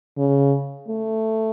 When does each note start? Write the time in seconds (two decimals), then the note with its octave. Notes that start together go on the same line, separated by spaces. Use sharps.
0.17 C#3
0.88 A3